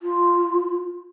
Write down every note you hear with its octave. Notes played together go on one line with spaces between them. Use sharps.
F4